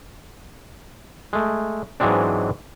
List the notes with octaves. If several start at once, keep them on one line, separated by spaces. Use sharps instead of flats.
G#3 A3
G#2 E3 F#3 G#3 C4 D4